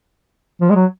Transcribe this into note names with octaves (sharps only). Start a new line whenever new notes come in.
F3
G#3
F#3